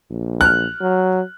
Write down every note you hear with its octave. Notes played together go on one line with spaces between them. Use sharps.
A#1
F6 F#6
F#3